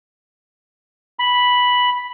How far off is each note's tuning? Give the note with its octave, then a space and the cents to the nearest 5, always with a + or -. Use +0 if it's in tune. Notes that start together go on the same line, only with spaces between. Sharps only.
B5 -5